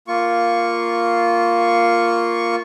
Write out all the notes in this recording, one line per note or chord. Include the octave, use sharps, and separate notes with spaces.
A#3 F4 C#6